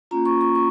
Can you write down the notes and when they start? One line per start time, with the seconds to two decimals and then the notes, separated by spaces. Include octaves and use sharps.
0.11 A#3 C#4 F4 A#5
0.25 C#6
0.41 C#6
0.55 C#6